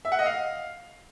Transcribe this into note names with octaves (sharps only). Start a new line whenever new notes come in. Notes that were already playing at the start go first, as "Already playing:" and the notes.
E5
F#5
D#5
F5